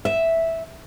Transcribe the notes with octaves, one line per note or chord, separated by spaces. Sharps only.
E5